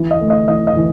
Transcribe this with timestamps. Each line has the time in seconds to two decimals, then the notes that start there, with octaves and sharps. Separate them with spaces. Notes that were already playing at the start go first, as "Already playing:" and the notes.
Already playing: E3
0.11 D#5
0.21 A3
0.30 D#5
0.48 E3 D#5
0.67 D#5
0.76 E3